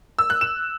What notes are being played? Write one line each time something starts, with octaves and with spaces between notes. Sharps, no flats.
E6
F#6
E7